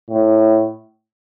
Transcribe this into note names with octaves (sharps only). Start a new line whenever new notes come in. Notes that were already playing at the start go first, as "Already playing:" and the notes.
A2